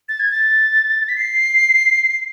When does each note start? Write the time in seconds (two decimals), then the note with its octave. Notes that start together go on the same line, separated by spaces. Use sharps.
0.09 A6
0.20 G#6
0.31 A6
1.09 B6
1.17 C7